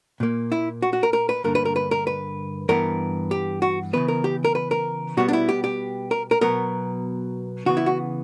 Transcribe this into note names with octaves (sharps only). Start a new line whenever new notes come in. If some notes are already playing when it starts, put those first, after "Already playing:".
A#2 A#3
E4
F#4
F#4
A#4
A#4
B4
G2 D3 A#3 A#4
B4
A#4
B4
A#4
B4
G2 E3 B3 A#4
G4
F#4
C#3 E3 B3 B4
A#4
G4
A#4
B4
A#4
B2 G3 B3 F#4
D4
E4
G4
G4
A#4
A#4
B2 F#3 B3 A#4
C#3 E3 B3 F#4
E4
F#4